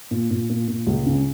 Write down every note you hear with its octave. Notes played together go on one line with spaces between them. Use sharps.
A#2
A#2
A#2
A#2
C#2
C#3